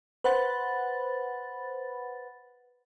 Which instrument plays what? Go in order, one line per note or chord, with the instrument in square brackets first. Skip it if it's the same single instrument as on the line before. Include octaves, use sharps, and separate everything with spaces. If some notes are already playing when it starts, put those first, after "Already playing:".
[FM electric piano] B4 C5 F#5 B5 A6